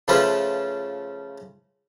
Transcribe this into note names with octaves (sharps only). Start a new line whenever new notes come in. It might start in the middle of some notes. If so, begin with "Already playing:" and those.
C#3 F3 A3 C#4 B4 C5